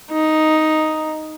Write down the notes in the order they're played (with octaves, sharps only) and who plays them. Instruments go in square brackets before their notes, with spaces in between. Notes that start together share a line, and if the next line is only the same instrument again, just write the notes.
[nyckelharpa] D#4